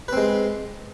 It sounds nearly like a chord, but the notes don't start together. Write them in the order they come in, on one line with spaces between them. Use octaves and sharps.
B4 C4 G#3